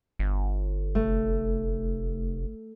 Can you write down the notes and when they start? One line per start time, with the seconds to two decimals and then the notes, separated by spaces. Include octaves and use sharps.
0.19 G1
0.95 F1 A3